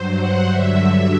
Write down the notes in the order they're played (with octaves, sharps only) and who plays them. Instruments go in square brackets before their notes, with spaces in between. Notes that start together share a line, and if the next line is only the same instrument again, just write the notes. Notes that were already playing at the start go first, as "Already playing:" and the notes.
Already playing: [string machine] G2 F#3 C5
F#5
G2 D3 F#3 E5
E5